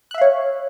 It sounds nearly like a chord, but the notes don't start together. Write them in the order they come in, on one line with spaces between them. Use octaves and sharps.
F#6 E5 F5 C#5